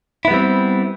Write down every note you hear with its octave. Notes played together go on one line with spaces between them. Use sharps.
G3 B3 C4 E4